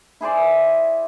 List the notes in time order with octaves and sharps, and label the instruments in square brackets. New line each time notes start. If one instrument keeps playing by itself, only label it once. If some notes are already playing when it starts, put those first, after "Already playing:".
[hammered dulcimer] E4 G#4 C5 D5